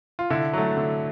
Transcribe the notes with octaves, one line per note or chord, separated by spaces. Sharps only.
F4
D3 E4
F#3 A3
D3